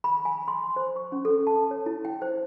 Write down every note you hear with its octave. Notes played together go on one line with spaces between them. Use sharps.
B5
G#5
C6
C5
C#6
C#4
A4
A5
C#5
E4
G5
C5